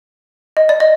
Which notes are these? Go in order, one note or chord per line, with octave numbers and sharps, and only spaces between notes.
D#5
D5
D#5